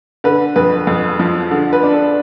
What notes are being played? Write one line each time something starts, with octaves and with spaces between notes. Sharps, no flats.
D3 B4
F2 B4
F2
F3
D3
B4
D4
A4